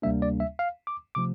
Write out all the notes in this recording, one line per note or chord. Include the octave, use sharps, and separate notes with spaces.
D2 C3 G3 A#3 D4 E5
D5
E5
F5
D6
C3 F3 A3 D6